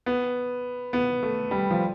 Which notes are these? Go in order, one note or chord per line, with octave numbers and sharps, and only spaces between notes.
B3
B3
A3
G3
F3